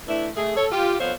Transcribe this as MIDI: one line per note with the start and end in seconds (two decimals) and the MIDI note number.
0.07 0.27 52
0.07 0.27 57
0.07 0.27 62
0.07 0.27 64
0.37 0.56 57
0.37 0.56 68
0.56 0.66 69
0.56 0.66 73
0.72 0.94 65
0.72 0.94 67
1.00 1.12 41
1.00 1.12 59
1.00 1.12 72
1.00 1.12 73
1.00 1.12 77